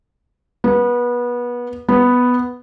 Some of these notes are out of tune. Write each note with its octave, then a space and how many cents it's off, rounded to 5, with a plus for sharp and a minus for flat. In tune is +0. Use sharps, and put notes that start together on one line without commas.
B3 -25
B3 +0